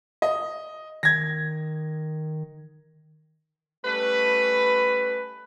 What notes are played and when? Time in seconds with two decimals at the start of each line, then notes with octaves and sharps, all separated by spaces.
0.22 D#5
1.03 D#3 G#6 A#6
3.85 G3 A3 C#4 B4